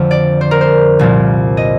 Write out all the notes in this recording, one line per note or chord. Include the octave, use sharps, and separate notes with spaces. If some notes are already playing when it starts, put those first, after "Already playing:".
Already playing: F2 D3 F3
D5
C5
A#4
C5
C2 A#2 F3
D#5